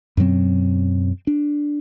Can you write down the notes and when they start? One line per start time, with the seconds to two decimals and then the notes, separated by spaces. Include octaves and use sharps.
0.17 F#2 B2 F#3 C4
1.27 D4